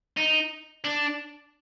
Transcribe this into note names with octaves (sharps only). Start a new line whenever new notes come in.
D#4
D4